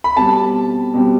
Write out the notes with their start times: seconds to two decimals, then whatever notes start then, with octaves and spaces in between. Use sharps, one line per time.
0.04 B5
0.16 B2 G3 C4 A5
0.94 B2 G3 C4